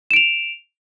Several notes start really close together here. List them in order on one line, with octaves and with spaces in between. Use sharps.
E7 D7 F7